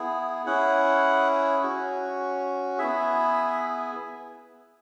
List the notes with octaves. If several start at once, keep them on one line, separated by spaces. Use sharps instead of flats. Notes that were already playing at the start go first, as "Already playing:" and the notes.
Already playing: B3 E4 G#4
C#4 E4 G#4 F#5
C#4 F#4
B3 E4 G#4 E5